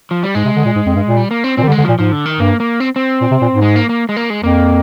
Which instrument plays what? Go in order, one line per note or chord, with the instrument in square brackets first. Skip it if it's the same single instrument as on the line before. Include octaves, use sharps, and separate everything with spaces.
[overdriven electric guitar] F3
G3
[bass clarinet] G#2 [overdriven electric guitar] G#3
[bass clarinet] C3
D3
A#2
G#2
F2
G2
A#2
[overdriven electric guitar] G3
A#3
C4
[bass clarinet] A#2 [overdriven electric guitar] C4
[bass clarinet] D#3
[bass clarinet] D3 [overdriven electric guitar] G3
[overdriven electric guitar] G#3
[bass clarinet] D3
[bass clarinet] A#2 [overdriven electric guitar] F3
[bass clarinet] G#2 [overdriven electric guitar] F3
[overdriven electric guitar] D3
D#3
[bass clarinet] G2 [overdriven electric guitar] A#3
[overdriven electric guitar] A#3
C4
C4
[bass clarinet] A#2
C3
A#2
G#2
[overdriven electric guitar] G#3
A#3
A#3
G#3
A#3
G#3
[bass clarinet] F2 [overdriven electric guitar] A#3